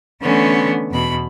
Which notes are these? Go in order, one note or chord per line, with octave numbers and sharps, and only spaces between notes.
D3 E3 A3 B3 C#4
E2 B2 B5